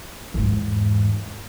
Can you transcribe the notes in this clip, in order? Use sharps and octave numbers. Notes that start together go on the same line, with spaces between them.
E2 G#2